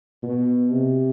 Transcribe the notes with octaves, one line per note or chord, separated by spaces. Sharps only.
B2
C3